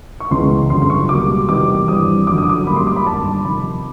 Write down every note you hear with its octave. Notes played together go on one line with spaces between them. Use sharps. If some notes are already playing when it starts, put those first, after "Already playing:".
C#6
C#2 C#3 E3 G#3 B3 C6
G1 F#2 C#3 C6
C6
C#6
C#2 B2 G3 A#3 D6
E2 C3 D#3 G3 B3 D6
G2 E3 G3 C4 D#6
F#1 F2 D3 F#3 D6
D#6
D6
G#2 D#3 G3 A#3 C#4 B5
C6
D6
B5
G1 G2 D#3 A5
F2 C3 D#3 B5